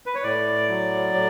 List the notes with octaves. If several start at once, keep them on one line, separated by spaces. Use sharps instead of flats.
B4
C#5
A2 D5
F#3
A2